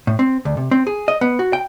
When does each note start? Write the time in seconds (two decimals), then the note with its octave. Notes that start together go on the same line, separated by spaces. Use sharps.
0.07 A2
0.19 C4
0.45 D2
0.57 C3
0.71 C4
0.87 G#4
1.08 D#5
1.21 B3
1.39 F#4
1.53 G5